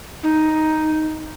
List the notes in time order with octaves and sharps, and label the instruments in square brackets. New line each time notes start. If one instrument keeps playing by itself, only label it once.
[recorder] D#4